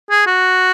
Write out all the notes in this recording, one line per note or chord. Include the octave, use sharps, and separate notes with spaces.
G#4
F#4